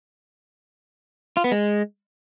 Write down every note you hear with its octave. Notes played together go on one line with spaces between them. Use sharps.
F4
B3
G#3